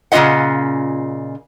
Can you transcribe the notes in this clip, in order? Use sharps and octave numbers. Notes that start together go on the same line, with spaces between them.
A#2 C#3 C#4 F4 D#5 F#5